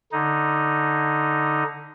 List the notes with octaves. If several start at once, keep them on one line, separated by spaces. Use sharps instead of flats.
D3 D#4